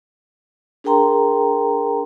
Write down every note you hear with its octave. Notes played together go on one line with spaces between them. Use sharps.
D4 G#4 A#4 G5 A#5 C6